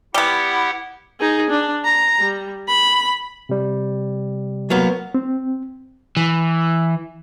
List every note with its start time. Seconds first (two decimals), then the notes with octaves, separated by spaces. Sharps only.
0.14 G3 B3 E4 G4 F#5
1.20 D#4 G#4
1.50 D4
1.85 A#5
2.19 G3
2.68 B5
3.49 C3 G3
4.70 F#3 A#3 B3
5.15 C4
6.17 E3